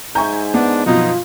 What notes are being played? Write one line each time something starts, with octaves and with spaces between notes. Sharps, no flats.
G#2 E5 G#5 A#5 C#6 G6
B3 D4
F#2 B2 F3 D#4 F4